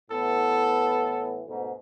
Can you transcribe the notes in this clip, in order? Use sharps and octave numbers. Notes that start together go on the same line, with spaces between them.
A2 E3 B3 A4
D2 G#2 B2